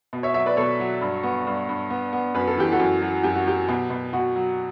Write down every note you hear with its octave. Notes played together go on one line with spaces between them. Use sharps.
B2
C#5 E5
F#3 C#5 E5
B4 D5
B2 A4 C#5
F#3
G2
B3
G2
G2
B3
B3
F#2 B4
A4
E3 G4
F#4 A4
F#2
F#3
F#2 G4
F#4
F#3 G4
B2
B2
B2 F#4
F#3